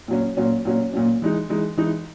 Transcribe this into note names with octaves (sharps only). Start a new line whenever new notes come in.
A#2 F#3 C#4
A#2 F#3 C#4
A#2 F#3 C#4
A#2 F#3 C#4
E3 G#3 D#4
E3 G#3 D#4
E3 G#3 D#4